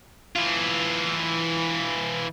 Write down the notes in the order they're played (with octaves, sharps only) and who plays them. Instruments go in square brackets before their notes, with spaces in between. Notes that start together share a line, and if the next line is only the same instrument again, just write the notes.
[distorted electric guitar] E3 F4